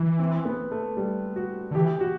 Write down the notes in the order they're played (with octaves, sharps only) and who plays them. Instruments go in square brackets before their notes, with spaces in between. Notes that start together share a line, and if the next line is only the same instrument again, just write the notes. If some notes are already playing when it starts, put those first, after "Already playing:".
Already playing: [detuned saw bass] E3
[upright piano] C4
B3
A3
G3
F#4
[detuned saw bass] D3
[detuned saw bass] E3 [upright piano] G4
[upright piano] F#4